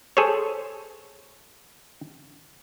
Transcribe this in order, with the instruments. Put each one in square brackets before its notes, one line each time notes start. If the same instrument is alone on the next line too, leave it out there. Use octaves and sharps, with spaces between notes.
[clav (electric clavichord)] G#4 A4 C5 C#5